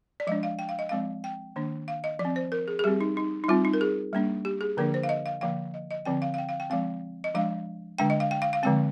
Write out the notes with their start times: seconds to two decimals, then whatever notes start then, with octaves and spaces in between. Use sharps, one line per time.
0.20 D5
0.27 F3 G#3 D4 D#5
0.43 F5
0.59 G5
0.69 F5
0.79 D#5
0.89 F3 G#3 C4 F5
1.24 G5
1.56 D#3 A#3 D4
1.88 F5
2.04 D#5
2.19 F3 D5
2.25 C4
2.36 C5
2.52 A#4
2.68 G#4
2.79 G#4
2.84 G3 C4 G4
3.01 D#4
3.17 D#4
3.44 D#4
3.48 G3 C4 F4
3.65 D#4
3.74 A#4
3.81 G#4
4.13 G3 A#3 D4
4.45 G4
4.61 G#4
4.77 D3 F3 A#3 D4 A#4
4.94 C5
5.03 F5
5.09 D#5
5.26 F5
5.41 D3 F3 A#3 F5
5.74 D#5
5.91 D#5
6.05 D3 F3 C4 G5
6.22 F5
6.34 F5
6.38 G5
6.49 F5
6.60 G5
6.70 F3 G#3 C4 F5
7.24 D#5
7.34 F3 G#3 D4 F5
7.98 D3 G#3 D4 G5
8.10 D#5
8.20 F5
8.31 G5
8.42 F5
8.53 F5
8.63 D3 F3 G#3 C4 G5